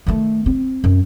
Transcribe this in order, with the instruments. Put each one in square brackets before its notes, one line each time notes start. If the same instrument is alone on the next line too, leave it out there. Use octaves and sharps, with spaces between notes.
[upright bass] D#3 A3
C4
F#2